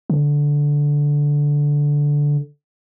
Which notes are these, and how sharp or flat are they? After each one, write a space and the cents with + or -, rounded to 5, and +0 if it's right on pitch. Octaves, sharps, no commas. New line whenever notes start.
D3 -10